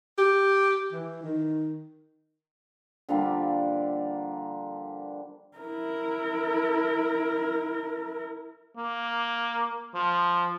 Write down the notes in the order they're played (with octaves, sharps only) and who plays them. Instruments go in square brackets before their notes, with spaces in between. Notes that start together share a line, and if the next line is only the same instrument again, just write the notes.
[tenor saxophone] G4
E3
D#3
[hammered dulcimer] D3 F3 G3 A#3
[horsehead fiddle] E4 A#4
[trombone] A#3
F3